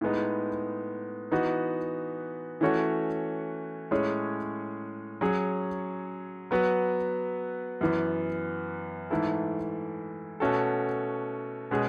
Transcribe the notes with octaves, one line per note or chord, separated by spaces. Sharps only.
A2 G#3 B3 D#4
E3 B3 D#4 F#4
E3 A3 C#4 F#4 C#5
A2 G#3 C#4 G#4 C#5
F#3 C#4 G#4 C#5
F#3 B3 F#4 B4
F#2 E3 B3
G#2 E3 A3 E4 A4
B2 A3 C#4 F#4 A4
B2 G#3 C#4 G#4